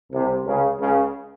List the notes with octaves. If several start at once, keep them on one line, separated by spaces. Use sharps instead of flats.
C2 C3
C#2 C#3
C#2 C#3